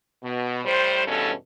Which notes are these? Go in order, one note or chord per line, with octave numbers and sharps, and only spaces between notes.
B2
A2 G3 C5
E2 G2 B2 C#4 A4